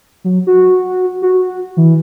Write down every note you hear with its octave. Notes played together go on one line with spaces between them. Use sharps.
F#3
F#4
F#4
E3